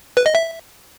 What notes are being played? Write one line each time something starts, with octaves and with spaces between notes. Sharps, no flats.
B4
D#5
E5